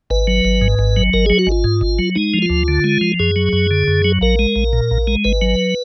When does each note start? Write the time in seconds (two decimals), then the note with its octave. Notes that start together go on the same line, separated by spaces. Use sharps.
0.10 G#1 B4
0.27 F#3
0.45 G#1
0.61 G#2
0.79 G#1
0.97 F#3
1.14 G#1 A#4
1.26 F#3 G#4
1.39 F#4
1.47 G#1 F4
1.64 G#2
1.81 G#1
1.99 F#3
2.15 G#3 D#4
2.34 F3
2.42 F4
2.50 D2
2.68 D3
2.84 G#3
3.01 F3
3.20 F#2 G#4
3.36 F#3
3.53 F#2
3.71 D3
3.88 F#2
4.05 F#3
4.21 A#1 A#4
4.39 G#3
4.56 A#1
4.73 A#2
4.91 A#1
5.07 G#3
5.24 G#1 B4
5.42 F#3